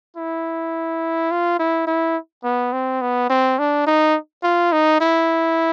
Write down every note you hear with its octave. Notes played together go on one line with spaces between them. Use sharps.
E4
F4
E4
E4
B3
C4
B3
C4
D4
D#4
F4
D#4
E4